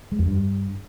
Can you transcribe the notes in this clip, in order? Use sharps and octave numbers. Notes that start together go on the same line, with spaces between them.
G#3
F2
G2